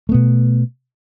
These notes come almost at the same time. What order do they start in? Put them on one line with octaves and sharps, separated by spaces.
A3 B3 B2